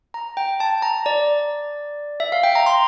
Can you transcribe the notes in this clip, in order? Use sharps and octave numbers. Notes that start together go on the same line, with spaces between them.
A#5
G5
A5
A#5
D5
E5
F5
G5
A#5
C6